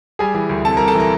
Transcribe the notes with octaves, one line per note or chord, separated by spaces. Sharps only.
G3 G#4 G#5
E3
D2
C3 A4 A5
G3 A#4 A#5
A4 A5
E3 A#4 A#5